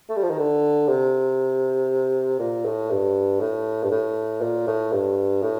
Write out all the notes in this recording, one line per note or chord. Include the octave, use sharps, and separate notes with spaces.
A3
G3
F3
D#3
D3
C3
A#2
A2
G2
A2
G2
A2
A#2
A2
G2
A2